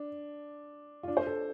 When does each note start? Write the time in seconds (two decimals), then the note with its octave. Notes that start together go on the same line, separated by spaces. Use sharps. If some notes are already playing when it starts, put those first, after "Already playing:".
Already playing: D4
1.03 F4
1.08 D4
1.17 C5
1.26 A4